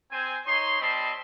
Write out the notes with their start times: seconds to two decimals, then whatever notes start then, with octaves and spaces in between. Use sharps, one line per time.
0.11 C4 C5 G#5
0.46 D#4 C#5 C6
0.81 G3 C4 D#5 A5 B5 C6